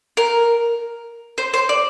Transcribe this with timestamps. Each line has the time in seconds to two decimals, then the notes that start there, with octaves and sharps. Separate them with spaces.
0.17 A#4
1.38 C5
1.54 C5
1.69 D5